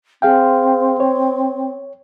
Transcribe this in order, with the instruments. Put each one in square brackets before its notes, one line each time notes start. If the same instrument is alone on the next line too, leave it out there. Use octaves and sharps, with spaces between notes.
[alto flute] C4 [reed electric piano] G#4 F5 G5
[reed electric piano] C#5